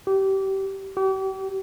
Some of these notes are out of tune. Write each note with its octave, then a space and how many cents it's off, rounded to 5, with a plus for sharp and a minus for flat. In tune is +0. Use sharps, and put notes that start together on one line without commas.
G4 -25
G4 -40